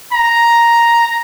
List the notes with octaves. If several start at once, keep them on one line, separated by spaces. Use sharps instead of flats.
A#5